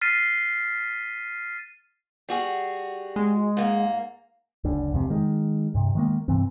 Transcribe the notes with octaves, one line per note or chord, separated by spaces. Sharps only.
F6 A6 B6 C7 D#7
G3 F#4 G#4
G#3
G#2 A#3
F#1 D2 D3
E1 F2 C3
D#3 G#3
G2 C3
D#3 G#3 A#3
G2 C3 E3 C4